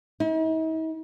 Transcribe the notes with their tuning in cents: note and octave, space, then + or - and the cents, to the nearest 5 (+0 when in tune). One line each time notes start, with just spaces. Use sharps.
D#4 +45